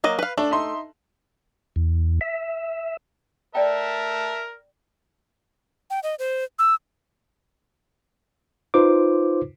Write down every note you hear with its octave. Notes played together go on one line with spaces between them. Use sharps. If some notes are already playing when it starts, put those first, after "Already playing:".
F#3 A#3 D#5
B4 F5
A3 D4
D#4 E5 C6
E2
E5
A#4 D5 E5 G5 A5
G5
D#5
C5
E6
D#4 F4 B4 C5 D6